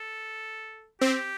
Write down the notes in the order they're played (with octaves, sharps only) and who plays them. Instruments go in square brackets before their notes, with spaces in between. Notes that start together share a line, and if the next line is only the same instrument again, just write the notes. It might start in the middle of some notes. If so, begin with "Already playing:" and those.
Already playing: [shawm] A4
[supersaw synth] C4 [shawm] G4